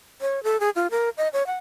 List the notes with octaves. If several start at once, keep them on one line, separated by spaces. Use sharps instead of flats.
C#5
A4
G#4
F4
A#4
D#5
C#5
F#5